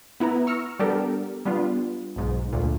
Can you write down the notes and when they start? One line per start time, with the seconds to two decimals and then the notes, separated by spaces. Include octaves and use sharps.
0.20 B3 E4 B4 A#5
0.47 C#6 E6 F6 A#6 C#7
0.79 G3 B3 D4 G4 A4 A#4
1.45 G3 B3 D4 F4
2.16 B1 G#2
2.53 D2 A#2